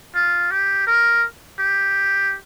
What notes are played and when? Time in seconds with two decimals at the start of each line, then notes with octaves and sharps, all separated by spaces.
0.15 F4
0.51 G4
0.87 A#4
1.59 G4